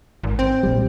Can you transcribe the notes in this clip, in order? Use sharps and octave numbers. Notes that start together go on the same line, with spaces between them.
G#1
C4
A#1 G3